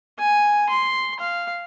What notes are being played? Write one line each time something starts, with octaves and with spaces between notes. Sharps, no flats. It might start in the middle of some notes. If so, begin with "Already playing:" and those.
G#5
C6
F5